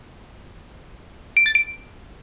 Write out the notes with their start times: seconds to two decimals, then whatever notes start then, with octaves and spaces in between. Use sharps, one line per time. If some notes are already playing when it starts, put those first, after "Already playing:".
1.37 D7
1.46 A6
1.55 D7